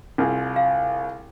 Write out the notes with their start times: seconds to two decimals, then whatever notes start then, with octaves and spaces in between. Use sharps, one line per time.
0.18 C2 F4 G#4
0.56 F5